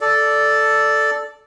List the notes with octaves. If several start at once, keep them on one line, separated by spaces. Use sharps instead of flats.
A4 D5